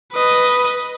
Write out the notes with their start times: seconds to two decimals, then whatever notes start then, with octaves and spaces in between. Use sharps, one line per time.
0.13 B4 D#5